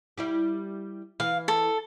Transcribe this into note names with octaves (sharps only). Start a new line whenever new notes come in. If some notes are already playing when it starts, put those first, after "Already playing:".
G3 E4 G4
E3 F5
A4